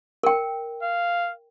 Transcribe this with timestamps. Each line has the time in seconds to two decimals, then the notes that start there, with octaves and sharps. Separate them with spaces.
0.23 A#4 G5
0.82 F5